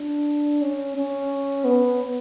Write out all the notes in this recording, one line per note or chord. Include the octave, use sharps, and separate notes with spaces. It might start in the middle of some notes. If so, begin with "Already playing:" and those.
Already playing: D4
C#4
C#4
B3